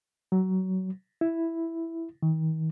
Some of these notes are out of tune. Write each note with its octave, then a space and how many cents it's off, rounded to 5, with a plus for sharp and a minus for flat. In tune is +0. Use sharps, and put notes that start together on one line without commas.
F#3 +20
E4 +0
D#3 +40